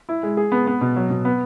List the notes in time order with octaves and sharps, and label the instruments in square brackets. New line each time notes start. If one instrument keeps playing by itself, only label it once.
[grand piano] E4
G#3
G#4
B3
B3
B2
F#3
B2
B3